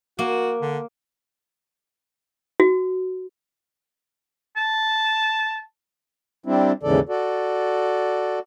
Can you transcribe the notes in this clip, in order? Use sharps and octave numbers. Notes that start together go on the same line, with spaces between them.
A#3 F#4
D3
F#4
A5
G3 C4 D4 E4
D#2 G#2 C#3 E3 A4 D5
F#4 A4 D5